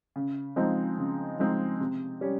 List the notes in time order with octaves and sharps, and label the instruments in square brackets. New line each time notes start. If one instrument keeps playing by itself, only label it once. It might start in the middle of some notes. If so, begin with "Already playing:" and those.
[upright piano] C#3
F3 G#3 C4 D#4
C#3
F3 G#3 C4 D#4
C3
G3 C#4